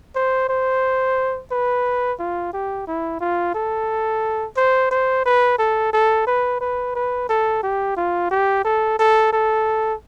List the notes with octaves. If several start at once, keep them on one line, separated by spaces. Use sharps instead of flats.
C5
C5
B4
F4
G4
E4
F4
A4
C5
C5
B4
A4
A4
B4
B4
B4
A4
G4
F4
G4
A4
A4
A4